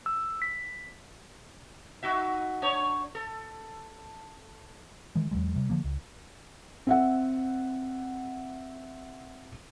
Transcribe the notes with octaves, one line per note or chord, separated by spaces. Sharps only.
E6
B6
D#4 F#4 E5
D4 C#5
A4
D#3 E3 G#3
E2 G2 F#3 G#3
C3 G3
D3 F3 A#3
C#2
C4 E5 F#5